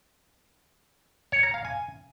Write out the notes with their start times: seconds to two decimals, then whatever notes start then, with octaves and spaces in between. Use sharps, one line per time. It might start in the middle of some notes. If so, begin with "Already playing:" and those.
1.32 C#5
1.43 A#5
1.54 F5
1.65 G#5